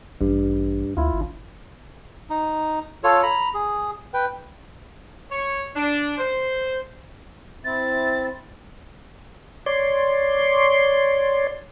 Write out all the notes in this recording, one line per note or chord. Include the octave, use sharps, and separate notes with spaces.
A1 G2
D2 E4 F4
G#1
D#4
F4 A4 C#5
A#5 B5
G#4
B4 G5
C#5
D4
C5
C4 E4 A6
C#5 D5 C6